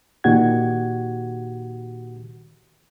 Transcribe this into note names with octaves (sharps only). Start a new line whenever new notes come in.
A#2 D#3 F#4 G4 F#5 G#6